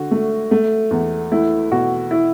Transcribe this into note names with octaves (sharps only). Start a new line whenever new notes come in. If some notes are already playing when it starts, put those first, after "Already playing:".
Already playing: D3 F#4
A3
A3
E2
A3 E4
B2 F#4
E4